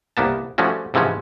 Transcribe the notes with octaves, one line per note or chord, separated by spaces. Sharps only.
C2 A#3 B3 A5
F3 G3 A3 C#4 F#4
G#2 C3 E3 F3 C#4